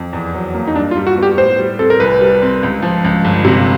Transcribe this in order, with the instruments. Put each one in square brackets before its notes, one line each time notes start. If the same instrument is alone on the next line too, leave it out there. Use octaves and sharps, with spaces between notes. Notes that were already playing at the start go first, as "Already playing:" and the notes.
Already playing: [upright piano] F2
E2
F#3
A#3
[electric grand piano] D#4
[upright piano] G2 [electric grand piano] D4
[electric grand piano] F4
[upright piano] G3
[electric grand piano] F#4
[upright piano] B3 [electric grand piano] G4
[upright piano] A2 [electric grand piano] C5
[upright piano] G3
[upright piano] C4 [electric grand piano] A4
[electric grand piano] A#4
[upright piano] C2 [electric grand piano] B4
[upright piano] G3
C4
C#2
F3
C#2
G1
C3